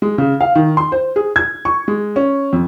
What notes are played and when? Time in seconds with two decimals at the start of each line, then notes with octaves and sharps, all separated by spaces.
0.02 G#3
0.18 C#3
0.41 F5
0.55 D#3
0.77 C6
0.92 C5
1.16 G#4
1.36 G#6
1.65 C#6
1.88 G#3
2.16 C#4
2.53 F2